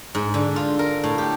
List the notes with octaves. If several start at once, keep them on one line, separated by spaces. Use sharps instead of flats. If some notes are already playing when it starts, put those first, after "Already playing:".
G#2
D3
F4
A#4
A2
G4